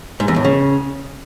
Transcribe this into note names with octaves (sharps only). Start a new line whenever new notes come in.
G#2
E2
A2
C#3